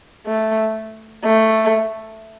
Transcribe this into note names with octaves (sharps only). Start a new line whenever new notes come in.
A3
A3